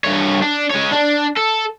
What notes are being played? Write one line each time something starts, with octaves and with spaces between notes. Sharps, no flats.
G2 C#5
D4
G#3 C#5
D4
A4